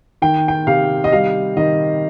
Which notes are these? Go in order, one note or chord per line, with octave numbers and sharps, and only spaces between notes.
D#3 G5
G5
C3 F5
D#5
G3 F5
D#3 D#5